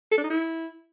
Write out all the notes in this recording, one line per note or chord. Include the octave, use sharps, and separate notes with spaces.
A4
D4
D#4
E4